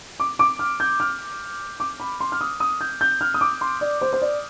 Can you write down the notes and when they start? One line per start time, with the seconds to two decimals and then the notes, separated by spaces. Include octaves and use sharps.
0.20 D6
0.39 D6
0.59 F6
0.80 G6
1.00 F6
1.80 D6
2.00 B5
2.20 C6
2.32 F6
2.41 D#6
2.60 D#6
2.81 G6
3.01 G6
3.21 F6
3.34 D#6
3.41 D6
3.61 C6
3.81 D5
4.01 C5
4.13 C5
4.22 D5